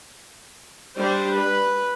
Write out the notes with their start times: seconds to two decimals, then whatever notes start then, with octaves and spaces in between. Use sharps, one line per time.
0.98 G3 D4 C5
1.35 B4